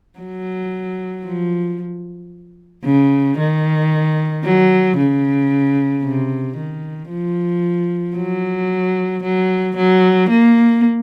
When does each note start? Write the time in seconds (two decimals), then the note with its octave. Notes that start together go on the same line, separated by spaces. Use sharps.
0.19 F#3
1.25 F3
2.85 C#3
3.38 D#3
4.45 F#3
4.98 C#3
6.03 C3
6.57 D#3
7.10 F3
8.17 F#3
9.23 F#3
9.77 F#3
10.29 A#3